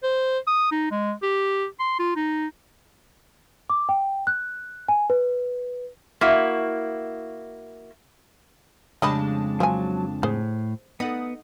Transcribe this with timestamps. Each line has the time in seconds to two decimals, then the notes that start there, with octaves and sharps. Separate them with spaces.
0.03 C5
0.47 D#6
0.72 D#4
0.91 G#3
1.23 G4
1.80 C6
1.99 F4
2.16 D#4
3.70 D6
3.89 G5
4.27 F#6
4.89 G#5
5.10 B4
6.21 A#3 E4 F#4
9.02 F2 C#3 G3 G#3 D4 D#5 A5 B5
9.60 F3 F#3 G#5
10.23 A2 G#4 C5
11.00 B3 D#4 A4 F#5 D#6